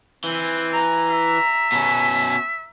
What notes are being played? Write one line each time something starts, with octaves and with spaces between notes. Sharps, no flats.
E3 C4
A#5
E5
B2 C#4